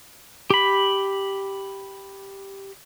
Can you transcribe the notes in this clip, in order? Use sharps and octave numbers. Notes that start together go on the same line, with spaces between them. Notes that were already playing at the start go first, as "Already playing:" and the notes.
G4 B5